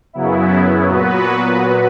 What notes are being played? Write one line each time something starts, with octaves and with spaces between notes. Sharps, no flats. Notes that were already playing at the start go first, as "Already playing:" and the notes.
F#2 C#3 F#3 B3 E4
A#2 F#3 B3 F#4 B4